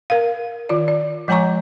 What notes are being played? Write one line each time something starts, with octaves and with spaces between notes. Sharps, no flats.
A#4 F5
D#3 F4 D5
D5
F3 G#3 C#5 G#5 A#5 C#6